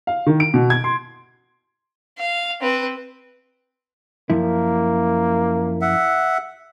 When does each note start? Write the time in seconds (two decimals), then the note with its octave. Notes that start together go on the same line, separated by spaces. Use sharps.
0.07 F5
0.26 D#3
0.40 D7
0.54 B2
0.70 G#6
0.84 C6
2.18 F5
2.61 C4 B4
4.30 F#2 F3 A#3 E4
5.81 E5 F#5